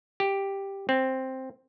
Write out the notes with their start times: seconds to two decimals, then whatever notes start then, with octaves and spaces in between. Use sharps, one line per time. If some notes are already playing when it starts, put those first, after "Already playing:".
0.20 G4
0.89 C4